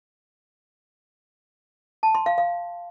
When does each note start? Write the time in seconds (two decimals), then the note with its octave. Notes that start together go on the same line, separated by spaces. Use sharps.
2.03 A5
2.15 C6
2.26 F5
2.38 F5